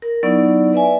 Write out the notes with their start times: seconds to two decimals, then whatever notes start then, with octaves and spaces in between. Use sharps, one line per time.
0.02 A#4
0.23 F#3 B3 D#4 E4 D5 C#6
0.73 B4 D5 E5 G#5